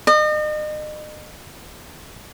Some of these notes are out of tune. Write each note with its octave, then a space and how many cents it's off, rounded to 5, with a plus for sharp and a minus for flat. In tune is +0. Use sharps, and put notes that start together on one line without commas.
D#5 -40